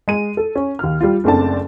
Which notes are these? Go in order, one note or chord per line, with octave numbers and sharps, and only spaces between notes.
G#3 D#7
A4
C#4
D#2 F6
G3 F4
F#1 A3 C4 D4 A5